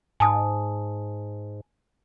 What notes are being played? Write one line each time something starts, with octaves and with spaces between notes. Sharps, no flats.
G#2 G#5 A5 D#6